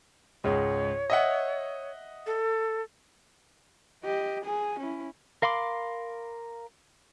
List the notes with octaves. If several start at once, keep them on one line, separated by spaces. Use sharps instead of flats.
C#2 G#2 C#5
D#5 E5 F#5
A4
G4 D#5
G#4 G#5
C#4 E4
A#4 F5 B5 C6 D6